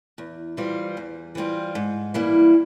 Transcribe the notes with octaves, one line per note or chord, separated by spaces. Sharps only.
E2
E3 G3 C4 F4
E2
E3 G3 C4 F4
G#2
E3 G3 A#3 E4